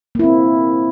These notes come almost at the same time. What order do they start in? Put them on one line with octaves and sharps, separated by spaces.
A#3 E4 C4